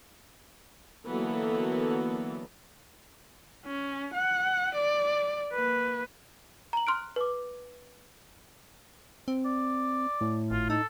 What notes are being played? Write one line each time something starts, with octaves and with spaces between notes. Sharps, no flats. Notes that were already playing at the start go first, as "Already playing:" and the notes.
D3 E3 F#3 A#3 B3 A4
C#4
F#5
D5
A#3 B4
A#5 F#7
C6 F6 F#6 D7
B4 D6
C4
D5
A2
G#1 F4
D#4 A4